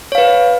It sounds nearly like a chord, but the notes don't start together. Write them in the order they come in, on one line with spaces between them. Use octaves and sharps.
C#5 F5 B4